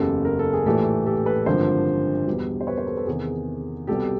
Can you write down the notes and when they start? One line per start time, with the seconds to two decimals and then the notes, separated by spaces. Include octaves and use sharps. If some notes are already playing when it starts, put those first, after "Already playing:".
Already playing: F#1 E2 C#3 G4 A4
0.25 A#4
0.39 A4
0.53 G#4
0.66 A#1 A2 E3 G4 A4
1.06 G4 A4
1.26 A4 B4
1.46 G#1 G2 D3 F3 A#4 C5
2.27 E2 B2 G3
2.61 C5
2.67 B4 C#5
2.77 A#4 C5
2.87 A4 B4
2.97 A4 B4
3.07 E2 C3 D#3 G#4 A#4
3.87 C2 B2 G3 G4 A4